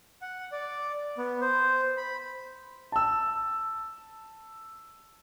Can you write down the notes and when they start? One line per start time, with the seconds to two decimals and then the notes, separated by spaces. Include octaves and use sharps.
0.21 F#5
0.52 D5
1.18 B3
1.41 C5
1.97 B5
2.92 A5 E6